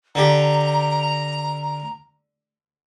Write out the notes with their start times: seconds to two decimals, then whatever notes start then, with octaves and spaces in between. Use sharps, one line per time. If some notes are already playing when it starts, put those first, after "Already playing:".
0.15 D3 G4 A#5